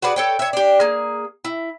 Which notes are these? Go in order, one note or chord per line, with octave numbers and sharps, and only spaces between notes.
F#4 G#4 B4 D5
A4 C#5 G5
C#5 E5
D4 G4
A#3 G#4
E4